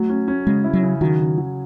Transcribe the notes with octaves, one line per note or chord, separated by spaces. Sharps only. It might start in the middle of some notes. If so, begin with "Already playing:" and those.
Already playing: F#3 A3
C#4
C#4
C#3 G#3
E4
F#3
C#3
D#3 F#3
C#3
F#3